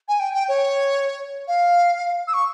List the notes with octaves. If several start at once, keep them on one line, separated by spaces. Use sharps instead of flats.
G#5
G5
G5
C#5
F5
E6
C#6